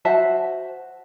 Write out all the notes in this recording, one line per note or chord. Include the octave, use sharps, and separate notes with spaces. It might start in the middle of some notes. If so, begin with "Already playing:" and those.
F#4 C5 E5 A5